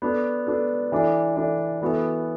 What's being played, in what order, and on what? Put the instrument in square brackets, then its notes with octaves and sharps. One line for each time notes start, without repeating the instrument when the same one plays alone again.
[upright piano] B3 D4 A4
B3 D4 A4
E3 D4 A4
E3 D4 A4
E3 B3 F#4 A4